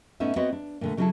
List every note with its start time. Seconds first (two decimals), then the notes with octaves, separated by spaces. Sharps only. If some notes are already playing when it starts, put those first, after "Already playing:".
0.20 A2 B3 C#4 D#4 E5
0.36 B3 C4 F#4 B4 C#5 D#5
0.53 D4
0.81 A#2 D3 A3
0.97 C#3 F#3 C#4 D#4 E4 A4